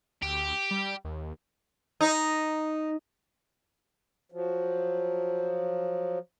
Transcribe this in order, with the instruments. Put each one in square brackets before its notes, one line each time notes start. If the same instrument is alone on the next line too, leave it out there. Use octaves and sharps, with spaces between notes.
[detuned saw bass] D2 [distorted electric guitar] G4
[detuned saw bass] G3
D#2
[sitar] D#4
[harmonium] F3 F#3